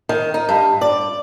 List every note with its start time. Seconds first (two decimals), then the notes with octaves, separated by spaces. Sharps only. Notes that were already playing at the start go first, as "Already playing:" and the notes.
0.09 D#3
0.34 D#4
0.49 G2
0.81 D5